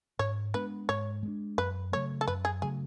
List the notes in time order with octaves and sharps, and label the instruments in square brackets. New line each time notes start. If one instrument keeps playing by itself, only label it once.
[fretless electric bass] G#2 [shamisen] C#5
[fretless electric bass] G#3 B3 D4 [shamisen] B4
[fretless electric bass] G#2 [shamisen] C#5
[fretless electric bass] G#3 B3 D4
[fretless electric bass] F#2 [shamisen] B4
[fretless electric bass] C#3 F#3 A3 [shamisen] C#5
[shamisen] A4
[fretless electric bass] F#2 [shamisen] B4
[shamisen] G#4
[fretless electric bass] C#3 F#3 A3 [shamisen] G#4